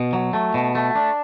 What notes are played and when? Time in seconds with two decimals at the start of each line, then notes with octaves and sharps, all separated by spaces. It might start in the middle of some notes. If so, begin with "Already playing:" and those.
Already playing: B2
0.13 F#3
0.33 A3
0.54 B2
0.75 A3
0.96 D4